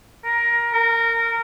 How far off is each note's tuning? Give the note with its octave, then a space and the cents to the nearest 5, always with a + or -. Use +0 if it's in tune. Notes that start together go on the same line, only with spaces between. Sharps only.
A#4 +15
A#4 -15